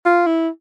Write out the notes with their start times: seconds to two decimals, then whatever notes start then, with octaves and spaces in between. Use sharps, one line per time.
0.05 F4
0.27 E4